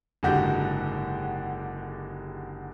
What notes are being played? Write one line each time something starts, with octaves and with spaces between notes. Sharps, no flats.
F#1 G#2 D3 F#4 G4 G6